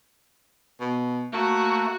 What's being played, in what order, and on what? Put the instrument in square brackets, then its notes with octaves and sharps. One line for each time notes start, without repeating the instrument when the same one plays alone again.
[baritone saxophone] B2
[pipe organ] A3 [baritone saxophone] A#3 [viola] F#4